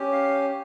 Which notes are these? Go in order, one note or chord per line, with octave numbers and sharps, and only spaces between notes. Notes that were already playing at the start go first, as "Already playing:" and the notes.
Already playing: C#4 G4
F5